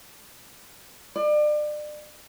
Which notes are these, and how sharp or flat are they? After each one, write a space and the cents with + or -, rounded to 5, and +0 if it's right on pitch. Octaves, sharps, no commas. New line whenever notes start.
D5 +35